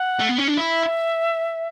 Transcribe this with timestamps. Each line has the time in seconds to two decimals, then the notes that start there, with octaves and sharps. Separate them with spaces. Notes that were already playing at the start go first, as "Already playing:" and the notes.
Already playing: F#5
0.20 A3
0.29 B3
0.38 C#4
0.48 D4
0.58 E4 E5